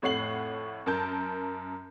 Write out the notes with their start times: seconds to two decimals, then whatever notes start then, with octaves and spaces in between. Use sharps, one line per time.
0.02 F2 A2 C#5 F#5 C7 F#7
0.86 F#2 A#4 A5 G6